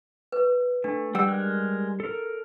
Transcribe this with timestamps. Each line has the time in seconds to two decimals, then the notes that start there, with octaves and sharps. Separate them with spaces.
0.32 B4
0.84 A3 D4
1.15 G3 F#5 G5 E6
1.28 G#3 A#4 F#6
2.00 A4 A#4